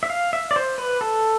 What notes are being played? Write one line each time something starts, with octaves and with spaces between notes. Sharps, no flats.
E5
F5
E5
D5
C5
B4
A4